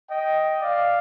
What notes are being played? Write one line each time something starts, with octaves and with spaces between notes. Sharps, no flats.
D#5 G5
D5 F5